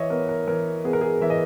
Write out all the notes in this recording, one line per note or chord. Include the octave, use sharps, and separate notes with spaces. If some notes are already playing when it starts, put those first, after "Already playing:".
Already playing: E3 C#5 D#5 E5
B3 A#4
A#4
E3 A#4
B3 G#4
A#4
G#4
E3 E5
D#5